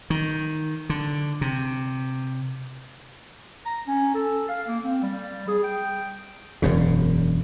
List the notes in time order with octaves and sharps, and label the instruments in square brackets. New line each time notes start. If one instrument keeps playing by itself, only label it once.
[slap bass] D#3
D3
C3
[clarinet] A#5
C#4
A4
F5
A#3
C4
G3
G#4
G5
[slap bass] E1 F#2 C#3